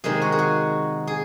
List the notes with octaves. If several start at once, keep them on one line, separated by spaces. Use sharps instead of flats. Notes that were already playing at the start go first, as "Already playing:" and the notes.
C3 D#3 G#3 C4 G#4
F#4
G#4
F#4
G#4